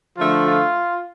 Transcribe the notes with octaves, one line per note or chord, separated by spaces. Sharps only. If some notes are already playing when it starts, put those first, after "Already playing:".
D3 F3 A3 F4
F4